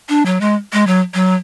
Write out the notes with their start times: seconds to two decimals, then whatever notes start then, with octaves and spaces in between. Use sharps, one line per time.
0.09 D4
0.26 F#3
0.41 G#3
0.73 G#3
0.87 F#3
1.14 F#3